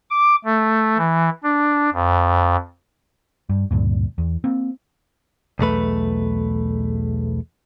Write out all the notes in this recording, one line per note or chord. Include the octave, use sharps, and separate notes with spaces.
D6
A3
E3
D4
F2
G2
D2 G2 A#2
E2
A#3 C4
B1 E2 A3 B4